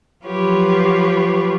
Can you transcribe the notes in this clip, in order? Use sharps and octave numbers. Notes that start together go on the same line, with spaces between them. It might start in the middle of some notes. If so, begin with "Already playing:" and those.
F3 F#3 F4 G4 B4 C#5